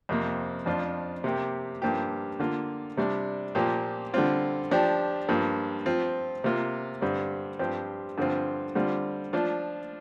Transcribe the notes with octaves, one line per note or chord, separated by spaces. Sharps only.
F2 C3 A#3
F2 F3 D4 F4
C3 A#3 G4
G2 F3 A#3 G4
D3 A#3 F4
C3 G3 D4
A#2 F3 A#3 G4
D3 G3 C4 F4
F3 D4 G4
G2 F3 A#3
F3 C4 F4
C3 A#3 F4
G2 D3 G3 C4
G2 F3 C4 G4
G2 D3 F3 C4 F4
D3 G3 C4 F4
F3 D4 F4